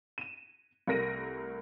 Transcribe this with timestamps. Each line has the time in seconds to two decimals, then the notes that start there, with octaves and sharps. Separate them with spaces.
0.18 D#7 E7
0.87 C2 A3 A#4 A#6 D7 D#7